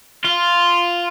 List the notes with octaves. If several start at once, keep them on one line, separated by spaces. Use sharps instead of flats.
F4